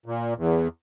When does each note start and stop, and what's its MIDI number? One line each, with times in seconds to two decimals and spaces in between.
0.06 0.34 46
0.37 0.68 40